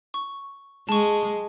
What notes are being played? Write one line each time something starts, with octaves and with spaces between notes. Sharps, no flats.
C#6
G#3 A5 C#6